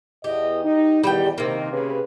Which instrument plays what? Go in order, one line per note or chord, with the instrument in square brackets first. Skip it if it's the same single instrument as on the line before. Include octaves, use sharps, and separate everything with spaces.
[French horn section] E2 D#5 [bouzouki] G4
[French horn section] D#4
[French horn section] E2 D#3 [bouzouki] G3 G4 G5
[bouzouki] C3 A#3 [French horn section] D#3 C4
[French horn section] C#3 B4